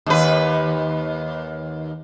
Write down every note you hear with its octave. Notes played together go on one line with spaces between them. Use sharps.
D#2 B4